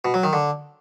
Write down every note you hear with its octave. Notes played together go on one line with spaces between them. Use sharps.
B2
F#3
D#3
D3